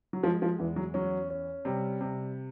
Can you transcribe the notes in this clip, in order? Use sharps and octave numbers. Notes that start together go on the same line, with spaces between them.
F#3
F3 G#3
F3
E2 E3
F#3
F#3 C#4
C#4
C3 G3
C3